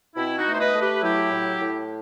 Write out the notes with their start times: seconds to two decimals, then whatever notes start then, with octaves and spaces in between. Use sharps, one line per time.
0.16 B2 C4 E4
0.39 D#4 F#4
0.46 A3
0.53 C5
0.60 B4 D#5
0.74 A3
0.81 G4 B4
1.02 F#3 E4 G4
1.32 A2
1.60 A2